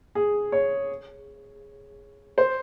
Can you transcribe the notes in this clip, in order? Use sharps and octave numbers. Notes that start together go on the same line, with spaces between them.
G#4
C#5
C5